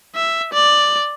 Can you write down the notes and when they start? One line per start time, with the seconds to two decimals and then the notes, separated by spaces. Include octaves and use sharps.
0.15 E5
0.53 D5